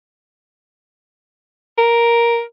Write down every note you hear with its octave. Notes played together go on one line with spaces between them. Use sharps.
A#4